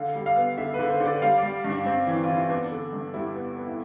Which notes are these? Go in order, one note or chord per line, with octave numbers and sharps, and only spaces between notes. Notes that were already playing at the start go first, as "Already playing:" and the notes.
Already playing: D3 F5
G3
F5
B3
D3 E5
B4
D3
C5
D3
D5
G3 F5
D5
G3
G2
D4
G2 C4
E3
F4
E3
E4
B3 D4
D3
G2
G3 E4
B3
B3
E4